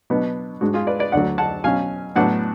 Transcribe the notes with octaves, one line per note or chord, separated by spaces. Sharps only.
B2 F#3 B3 D4
G#2 G#3 D4 F#4
F4 G#4
B4 D5
B4 D5
D2 D3 F#3 D5 F#5
F#5 A5
B2 F#3 C#4 F5 G#5
A2 F#3 B3 D4 F#5 A5